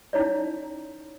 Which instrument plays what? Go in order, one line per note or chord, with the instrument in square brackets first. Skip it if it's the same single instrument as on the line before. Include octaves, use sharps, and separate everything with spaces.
[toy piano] C#4 D#4 E4 C#5 D5